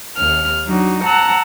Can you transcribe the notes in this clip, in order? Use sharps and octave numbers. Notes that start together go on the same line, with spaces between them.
D#2 F6
F#3 D4 D#4 F#4
F#5 A5 A#5 E6 F#6